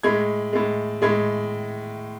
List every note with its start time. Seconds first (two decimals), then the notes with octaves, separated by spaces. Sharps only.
0.03 A2 G#3 G#6
0.53 A2 G#3
1.02 A2 G#3 G#6